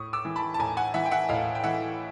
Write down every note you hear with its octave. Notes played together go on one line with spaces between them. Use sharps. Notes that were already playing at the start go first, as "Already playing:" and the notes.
Already playing: A2 C#6 D#6
D6 E6
E3
A5 B5
A5
A2 G#5 A#5
F#5 G#5
E3 E5 F#5
G5
E5 F#5
A2 D#5 F5
G5
E3 E5 F#5